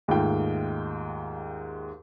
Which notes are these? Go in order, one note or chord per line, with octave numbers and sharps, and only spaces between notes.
D#2 G#2 A3 F4 F5 G5